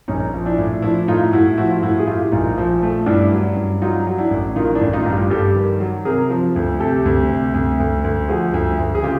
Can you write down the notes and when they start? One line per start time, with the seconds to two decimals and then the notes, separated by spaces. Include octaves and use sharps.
0.08 A#1 C#4 D#4
0.33 F3
0.45 D4 E4
0.58 A2
0.82 F3 D4 E4
1.08 A2 D#4 F4
1.32 A2 E4 F#4
1.58 F3 E4 F#4
1.71 F4
1.83 A2 E4 F#4
1.99 G#4
2.07 A2 F4 G4
2.32 A#1 D#4 F4
2.58 F3
2.83 A3
3.06 G2 D4 E4
3.32 F#3
3.56 G2
3.82 F#3 D#4 F4
4.07 F#3
4.18 D4 E4
4.31 A1
4.56 D#3 D#4 F4
4.75 D4 E4
4.81 A1
4.93 D#4 F4
5.06 G2
5.12 F4 G4
5.30 G2 G4 A4
5.56 D#3
5.80 F#3
6.05 C3 G#4 A#4
6.30 F3
6.56 D2
6.79 C3 G4 A4
7.05 D2
7.29 C3
7.54 D2
7.80 D2
8.04 D2
8.29 F3 F#4 G#4
8.54 D2
8.79 D2
8.95 G#4
9.03 C#3 F4 G4